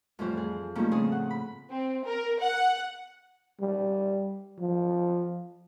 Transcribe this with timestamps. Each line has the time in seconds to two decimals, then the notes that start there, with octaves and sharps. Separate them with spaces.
0.19 F2 A2 E3 G3 C5
0.37 G#4
0.75 D#3 F3 G3 A3 A#3 C#4
0.91 A2 C#3 C4 G#4 C5 D#6
1.12 F#5
1.30 B5
1.70 C4
2.05 A#4
2.41 F#5
3.60 G3
4.59 F3